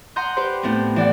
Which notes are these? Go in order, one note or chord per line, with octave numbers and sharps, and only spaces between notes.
F#5 A#5 C6 D#6 G6
G4 B4 C5
A2 B3 C4
E3 D5 F#5